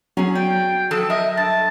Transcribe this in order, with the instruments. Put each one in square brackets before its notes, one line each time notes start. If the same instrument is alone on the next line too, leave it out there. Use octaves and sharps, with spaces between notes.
[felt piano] F#3 [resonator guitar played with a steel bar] C#4 G#4
[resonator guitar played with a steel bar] D5 [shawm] G5
[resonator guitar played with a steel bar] F3 A4 A5
[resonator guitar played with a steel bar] A#4 E5 [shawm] D#5
[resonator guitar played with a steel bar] G2 [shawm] A5